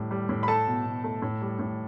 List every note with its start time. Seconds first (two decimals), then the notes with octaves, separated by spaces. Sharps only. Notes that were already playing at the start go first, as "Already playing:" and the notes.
Already playing: A2 G3
0.11 G3
0.29 A2
0.43 B5
0.48 A3 A4 A5
0.67 B2
0.86 B2
1.04 A3
1.22 A2
1.42 G3
1.59 A2